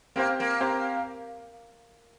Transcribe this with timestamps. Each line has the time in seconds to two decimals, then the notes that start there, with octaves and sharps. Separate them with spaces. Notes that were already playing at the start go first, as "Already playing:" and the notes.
0.16 A#3 C4 G4 C5 F5
0.40 A#3
0.60 C4 G4 C5 F5